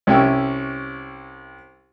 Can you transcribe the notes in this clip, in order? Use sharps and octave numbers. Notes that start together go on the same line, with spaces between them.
C2 C#4 G4 E5